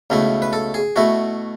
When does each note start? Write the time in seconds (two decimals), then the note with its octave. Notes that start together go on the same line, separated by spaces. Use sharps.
0.10 C#2 B2 A3 E4
0.42 B4
0.53 A4
0.74 G#4
0.96 B2 A3 E4 F#4